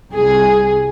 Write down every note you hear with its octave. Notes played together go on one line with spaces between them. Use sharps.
C2 G#4